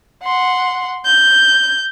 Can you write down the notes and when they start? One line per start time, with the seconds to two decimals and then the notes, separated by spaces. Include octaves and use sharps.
0.23 F#5 C6
1.05 G6